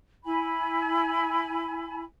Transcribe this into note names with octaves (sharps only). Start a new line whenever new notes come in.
E4 G#5 B5